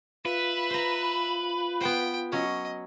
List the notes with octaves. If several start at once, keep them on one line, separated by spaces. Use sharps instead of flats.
F4 B4 E5
C5 A#5
B3 C5 G5
F#3 C#4 D#5